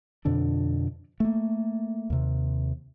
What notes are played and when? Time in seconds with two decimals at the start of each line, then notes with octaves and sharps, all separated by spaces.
0.25 F2 B2 D3 D4
1.20 A3 A#3
2.10 D#2 C3